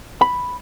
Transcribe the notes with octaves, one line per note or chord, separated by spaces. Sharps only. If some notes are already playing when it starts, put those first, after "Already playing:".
B5